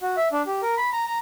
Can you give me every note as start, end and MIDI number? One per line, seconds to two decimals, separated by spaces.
0.01 0.16 66
0.17 0.28 76
0.32 0.42 62
0.47 0.61 67
0.62 0.75 70
0.77 0.90 83
0.93 1.05 82
1.06 1.19 82